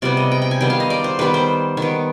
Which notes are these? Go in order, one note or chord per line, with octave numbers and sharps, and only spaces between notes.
C3 G3 B3 D5
D#5
G5
G5
G#5
D#3 G3 B3 G5
F5
D#5
D5
C5
D#3 G3 B3 B4
C5
D#3 B3